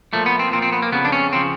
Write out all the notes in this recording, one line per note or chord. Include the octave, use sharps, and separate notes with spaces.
A#2 F3 A3
B3
C4
A#2 F3 C4
C4
B3
A#3
F2 C#3 F3 B3
D4
C#4
C#3 F3 C4